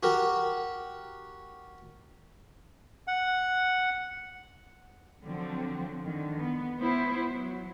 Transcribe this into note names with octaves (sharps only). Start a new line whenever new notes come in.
F#4 G4 A#4
F#5
D3 F3 F#3 C4
D3 D#3
B3
B3 E4 C5
F#3